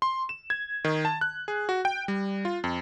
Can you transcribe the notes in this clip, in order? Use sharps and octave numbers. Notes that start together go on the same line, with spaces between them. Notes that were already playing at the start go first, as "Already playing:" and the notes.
C6
E7
G#6
D#3
A5
F#6
G#4
F#4
G5
G3
F4
F2